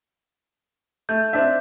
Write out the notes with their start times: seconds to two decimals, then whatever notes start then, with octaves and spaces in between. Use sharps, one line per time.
1.09 A3 G6
1.33 C4 D4 E5